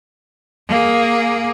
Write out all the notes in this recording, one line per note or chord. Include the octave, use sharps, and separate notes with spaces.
A#3 G#4